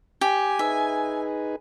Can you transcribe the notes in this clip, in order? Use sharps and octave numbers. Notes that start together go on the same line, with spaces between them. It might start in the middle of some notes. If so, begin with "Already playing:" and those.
G4 G#5
D#4 G#4 B4 E5